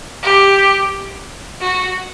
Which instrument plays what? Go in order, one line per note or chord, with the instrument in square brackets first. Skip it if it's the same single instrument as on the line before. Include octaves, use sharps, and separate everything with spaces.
[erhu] G4
F#4